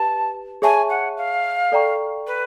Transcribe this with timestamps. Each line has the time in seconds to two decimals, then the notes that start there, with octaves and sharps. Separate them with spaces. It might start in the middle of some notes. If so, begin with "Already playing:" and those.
Already playing: G4 B4 A5
0.62 G#4 C#5 E5 G#5 A5 C#6
0.89 F#5
1.17 F5
1.72 A4 D5 G5 A#5 C#6
2.27 B4